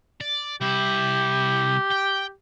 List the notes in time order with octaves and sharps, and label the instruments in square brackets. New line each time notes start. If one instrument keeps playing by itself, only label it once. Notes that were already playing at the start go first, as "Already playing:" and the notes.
[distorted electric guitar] D5
[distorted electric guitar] C2 E4 [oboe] G4
[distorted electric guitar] G5